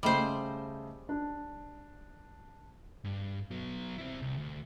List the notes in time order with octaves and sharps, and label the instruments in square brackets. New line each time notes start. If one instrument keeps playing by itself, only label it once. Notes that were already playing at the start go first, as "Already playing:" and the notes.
[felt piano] C#3 A3 D#5 [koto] G3 C5
[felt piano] D4
[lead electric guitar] G2
F#3 B3
C4 E4
C2
D2